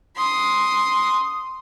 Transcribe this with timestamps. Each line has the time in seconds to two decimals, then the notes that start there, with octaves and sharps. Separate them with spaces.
0.16 C6 D#6